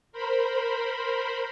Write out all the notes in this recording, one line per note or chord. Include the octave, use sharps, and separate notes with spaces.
A#4 C5 B5